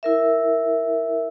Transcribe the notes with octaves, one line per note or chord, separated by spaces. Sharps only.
E4 A#4 E5